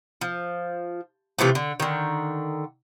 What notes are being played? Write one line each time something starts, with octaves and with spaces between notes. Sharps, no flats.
F3
C3 E3 F3 A3
D3
D3 D#3